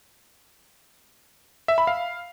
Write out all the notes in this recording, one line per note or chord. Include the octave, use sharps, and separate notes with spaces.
E5
B5
F5